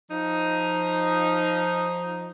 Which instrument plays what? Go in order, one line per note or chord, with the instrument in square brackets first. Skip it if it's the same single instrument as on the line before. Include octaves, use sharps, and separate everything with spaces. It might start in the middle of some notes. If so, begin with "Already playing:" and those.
[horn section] F3 D#4